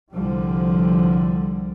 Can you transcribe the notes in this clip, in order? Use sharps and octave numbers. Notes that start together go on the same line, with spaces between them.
C2 D3 F3 G3